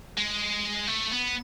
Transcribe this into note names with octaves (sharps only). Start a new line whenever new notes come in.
G#3
A3
B3